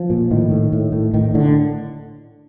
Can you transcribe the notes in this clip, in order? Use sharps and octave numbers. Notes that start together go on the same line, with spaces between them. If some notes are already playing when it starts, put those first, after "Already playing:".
Already playing: F3
A#2
A2 D#3
A2
A2
A2
A2 D#3
A2 D3